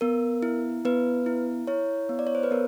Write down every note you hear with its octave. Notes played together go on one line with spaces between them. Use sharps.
B3 A#4
E4
B3 B4
E4
E4 C#5
B3
D5
C#5
C5
B4
B3 A#4